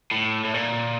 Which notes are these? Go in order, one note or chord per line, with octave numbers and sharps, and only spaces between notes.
A2
A2
A#2